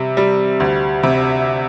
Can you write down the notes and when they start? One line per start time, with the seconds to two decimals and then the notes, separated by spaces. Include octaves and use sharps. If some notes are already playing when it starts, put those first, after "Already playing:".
Already playing: C3 G3
0.17 G3
0.60 D2
1.03 C3